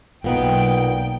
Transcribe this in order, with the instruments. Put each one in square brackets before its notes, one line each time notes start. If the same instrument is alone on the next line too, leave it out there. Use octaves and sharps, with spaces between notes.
[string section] B1 G5 [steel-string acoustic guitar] A#2 B3 D#4